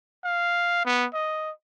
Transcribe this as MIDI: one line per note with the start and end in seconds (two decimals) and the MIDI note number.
0.24 0.82 77
0.85 1.06 59
1.14 1.51 75